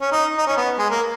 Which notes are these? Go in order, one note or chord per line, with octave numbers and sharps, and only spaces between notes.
C#4
D#4
D#4
C#4
B3
G#3
A#3